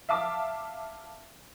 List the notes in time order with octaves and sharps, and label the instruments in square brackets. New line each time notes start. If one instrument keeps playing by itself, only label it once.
[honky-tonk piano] E5 F5 A5 D6